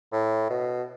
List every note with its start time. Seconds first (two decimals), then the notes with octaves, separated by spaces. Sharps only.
0.12 A2
0.50 B2